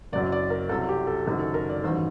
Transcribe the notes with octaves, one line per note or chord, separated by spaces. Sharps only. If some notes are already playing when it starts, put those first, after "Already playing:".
F#1 F#2 F#3 D5
D5
A#4
C2 C3 F#3 A4
G4
A4
F#1 F#2 D#3 F#3 G4
A4
A#4
D5
A1 G2 D#3 F#3 C5